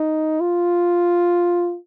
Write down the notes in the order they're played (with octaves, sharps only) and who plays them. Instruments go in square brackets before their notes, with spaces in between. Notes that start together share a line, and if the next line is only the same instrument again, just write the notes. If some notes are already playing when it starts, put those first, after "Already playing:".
Already playing: [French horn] D#4
F4